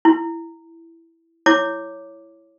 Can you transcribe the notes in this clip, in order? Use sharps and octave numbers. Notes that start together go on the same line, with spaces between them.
E4
E4 C#5 D6